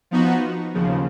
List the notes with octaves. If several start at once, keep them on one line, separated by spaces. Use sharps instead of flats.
F3 B3 D#4 F#4
D#2 C#3 F3